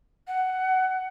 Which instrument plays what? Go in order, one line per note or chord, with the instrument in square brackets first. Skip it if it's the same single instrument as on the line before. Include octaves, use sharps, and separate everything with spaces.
[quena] F#5